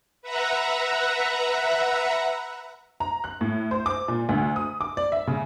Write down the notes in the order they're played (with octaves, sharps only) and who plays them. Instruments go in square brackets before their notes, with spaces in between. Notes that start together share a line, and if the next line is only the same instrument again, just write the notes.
[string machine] B4 E5 F#5 A#5
[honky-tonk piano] A#5
F#6
A2
C5
D6
A#2
D2
D#6
D6
D5
E5
C#3